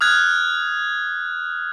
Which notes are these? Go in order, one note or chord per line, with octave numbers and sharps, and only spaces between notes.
D#6 F6 F#6 G#6